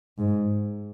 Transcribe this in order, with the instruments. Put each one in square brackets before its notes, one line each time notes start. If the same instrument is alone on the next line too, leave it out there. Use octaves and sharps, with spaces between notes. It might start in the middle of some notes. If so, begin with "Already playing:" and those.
[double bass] G#2